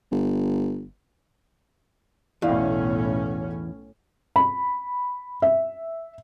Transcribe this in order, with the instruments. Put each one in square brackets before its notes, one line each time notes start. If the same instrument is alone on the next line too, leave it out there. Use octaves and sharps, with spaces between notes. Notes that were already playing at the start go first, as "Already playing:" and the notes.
[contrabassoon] G1
[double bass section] B1 A2 C#4 [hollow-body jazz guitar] E2 [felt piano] E4 D5 F5
[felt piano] B5
E5